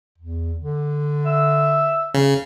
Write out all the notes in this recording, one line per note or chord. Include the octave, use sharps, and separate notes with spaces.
E2
D3
E5
C#3